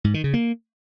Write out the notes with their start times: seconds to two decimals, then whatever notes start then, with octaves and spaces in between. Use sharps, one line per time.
0.04 G#2
0.14 D#3
0.24 C#3
0.34 A#3